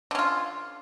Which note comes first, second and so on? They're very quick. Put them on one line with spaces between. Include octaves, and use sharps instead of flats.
D3 C#4 F4